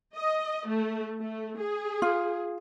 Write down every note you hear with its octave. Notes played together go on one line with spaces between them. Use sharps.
D#5
A3
A3
G#4
F4